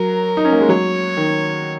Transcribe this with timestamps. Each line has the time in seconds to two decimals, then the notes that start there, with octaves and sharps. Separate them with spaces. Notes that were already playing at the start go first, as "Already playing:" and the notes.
Already playing: F#3 A#4
0.37 D#4
0.45 C#4
0.52 A#3
0.61 G#3
0.69 F#3 C#5
1.17 D#3